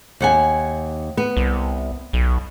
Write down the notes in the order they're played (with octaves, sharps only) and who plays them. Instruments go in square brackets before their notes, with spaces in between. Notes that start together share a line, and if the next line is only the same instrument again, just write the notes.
[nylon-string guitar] D#2 F#5 G#5
B3
[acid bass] C2
B1